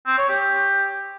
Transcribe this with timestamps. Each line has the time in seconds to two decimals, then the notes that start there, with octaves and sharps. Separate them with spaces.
0.06 C4
0.18 C#5
0.29 G4